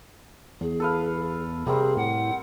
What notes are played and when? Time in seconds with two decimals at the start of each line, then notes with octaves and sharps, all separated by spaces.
0.61 E2 G#4
0.80 A4 B4 F5
1.67 C3 G3 A#3 C4 G#4
1.97 A2 F#5